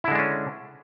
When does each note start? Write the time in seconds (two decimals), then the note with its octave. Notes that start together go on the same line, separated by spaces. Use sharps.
0.04 E4
0.08 D3
0.11 G#3
0.15 D4
0.19 C#4